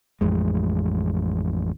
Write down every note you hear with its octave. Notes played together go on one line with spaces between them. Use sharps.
A1 F2 G#3